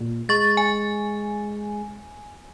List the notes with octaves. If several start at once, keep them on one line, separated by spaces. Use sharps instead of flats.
A#2
G#3 C#6 A6
G#5